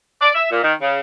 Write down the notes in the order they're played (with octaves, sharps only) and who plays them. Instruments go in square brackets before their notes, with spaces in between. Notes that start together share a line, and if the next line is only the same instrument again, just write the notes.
[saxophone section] D5
E5
A#2
D#3
C#3